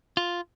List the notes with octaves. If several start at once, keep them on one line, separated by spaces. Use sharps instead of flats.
F4